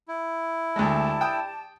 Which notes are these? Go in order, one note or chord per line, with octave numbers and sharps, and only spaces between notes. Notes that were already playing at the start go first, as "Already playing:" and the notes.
E4
D2 G#3 G4 D5 A5
G5 D#6